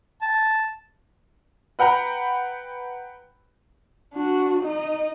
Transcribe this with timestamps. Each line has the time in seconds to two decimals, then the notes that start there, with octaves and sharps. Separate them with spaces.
0.22 A5
1.79 B4 F#5 G5 A#5 B5
4.13 D4 F#4
4.63 D#4 D#5